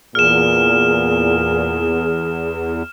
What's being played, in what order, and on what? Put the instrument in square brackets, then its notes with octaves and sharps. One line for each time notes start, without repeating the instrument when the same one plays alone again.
[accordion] E2 [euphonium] A#2 [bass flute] G#4 [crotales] F6 E7